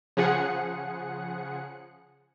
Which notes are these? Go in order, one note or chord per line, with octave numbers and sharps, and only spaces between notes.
C#3 F3 G#4 F#5 C#7